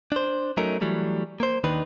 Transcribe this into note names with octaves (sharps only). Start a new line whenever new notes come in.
D4 C5
F#3 A3 C#4 D#4 A#4
E3 F#3 G3 A3
A#3 C5
D#2 D#3 D4 D#4 B4